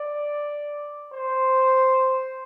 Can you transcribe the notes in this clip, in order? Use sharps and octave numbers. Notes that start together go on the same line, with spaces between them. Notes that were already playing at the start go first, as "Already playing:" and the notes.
Already playing: D5
C5